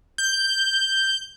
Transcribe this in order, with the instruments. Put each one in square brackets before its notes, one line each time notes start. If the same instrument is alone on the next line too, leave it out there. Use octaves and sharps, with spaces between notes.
[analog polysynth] G6